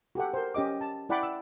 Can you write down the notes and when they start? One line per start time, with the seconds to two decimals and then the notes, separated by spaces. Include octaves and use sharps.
0.15 F#4 G4 A4 F#5
0.34 A#4 C5
0.54 C#4 G4 D#5 D6
0.81 A5
1.09 E4 D5 F#5 G5 B5 D6
1.23 E6